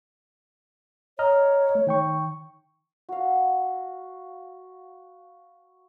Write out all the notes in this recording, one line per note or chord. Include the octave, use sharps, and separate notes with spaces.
C#5 D#5 A#5 F6
A3
D#3 G5 C#6
F#4 F5